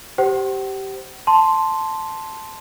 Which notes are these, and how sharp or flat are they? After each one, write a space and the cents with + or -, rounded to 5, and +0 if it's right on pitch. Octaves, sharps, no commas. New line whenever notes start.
G4 -15 C5 +0 F#5 +45
A5 +0 C6 +0